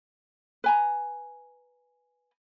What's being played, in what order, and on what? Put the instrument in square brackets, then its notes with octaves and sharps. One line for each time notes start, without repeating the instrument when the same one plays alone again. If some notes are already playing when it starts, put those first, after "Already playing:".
[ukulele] B4 G#5 A#5